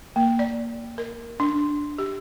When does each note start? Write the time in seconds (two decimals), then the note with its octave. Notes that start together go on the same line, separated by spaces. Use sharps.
0.16 A#3
0.39 D5
0.98 A#4
1.40 D4
1.98 G4